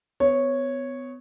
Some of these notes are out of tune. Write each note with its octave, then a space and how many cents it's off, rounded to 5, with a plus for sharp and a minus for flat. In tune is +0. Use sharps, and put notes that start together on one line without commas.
B3 +30 C#5 -5